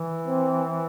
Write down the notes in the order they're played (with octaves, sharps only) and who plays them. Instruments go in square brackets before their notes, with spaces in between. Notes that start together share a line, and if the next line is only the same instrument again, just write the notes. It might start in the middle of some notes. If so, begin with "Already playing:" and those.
Already playing: [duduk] E3
[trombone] C4